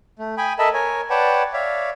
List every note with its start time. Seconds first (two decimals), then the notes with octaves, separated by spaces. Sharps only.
0.19 A3
0.37 G5 G#5 B5 D#6
0.59 A4 A#4 D#5 E5 A5 B5
0.74 A#4 C#5 G#5
1.10 B4 C#5 D5 F#5 G5 A5
1.53 C#5 D5 E5 F5